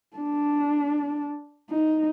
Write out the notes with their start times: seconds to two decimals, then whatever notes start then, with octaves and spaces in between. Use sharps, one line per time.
0.17 D4
1.70 D#4